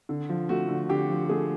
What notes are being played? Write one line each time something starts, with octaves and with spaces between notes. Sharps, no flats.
D3
F3
A3 F#4
D3
D3 G4
F3
A3 G#4